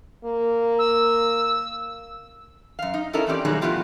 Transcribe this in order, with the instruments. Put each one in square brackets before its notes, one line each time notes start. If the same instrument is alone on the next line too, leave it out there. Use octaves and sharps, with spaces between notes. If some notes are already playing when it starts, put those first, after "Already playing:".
[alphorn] A#3
[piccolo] E6
[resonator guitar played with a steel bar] F#2 F5
D#4
C#4 E4 A4 A#4 C#5 D#5
E3 C4 C#4 G4 D5
B2 D#3 F#3 G3 D#4 G#4
F3 A3 B3 E4 F4 G4